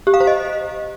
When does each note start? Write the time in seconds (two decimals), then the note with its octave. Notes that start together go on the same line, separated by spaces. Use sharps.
0.07 G4
0.14 F5
0.20 C5
0.27 D#5